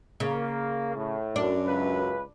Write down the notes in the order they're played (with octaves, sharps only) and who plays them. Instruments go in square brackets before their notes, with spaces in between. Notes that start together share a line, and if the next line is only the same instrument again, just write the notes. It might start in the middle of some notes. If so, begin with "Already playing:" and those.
[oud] C#3 [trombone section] A#3
[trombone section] A2
[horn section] F#2 [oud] D4
[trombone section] C#2 B4